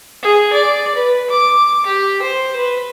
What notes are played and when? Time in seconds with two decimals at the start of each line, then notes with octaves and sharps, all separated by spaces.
0.22 G#4
0.53 D5
0.95 B4
1.30 D6
1.86 G4
2.22 C5
2.56 B4